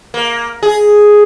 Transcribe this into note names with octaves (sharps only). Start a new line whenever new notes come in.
A#3
G#4